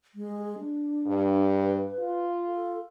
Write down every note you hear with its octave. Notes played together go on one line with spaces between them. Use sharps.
G#3
D4
G2
B4
F4
A4